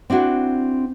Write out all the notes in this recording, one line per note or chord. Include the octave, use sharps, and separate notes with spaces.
C4 D4 E4 F#4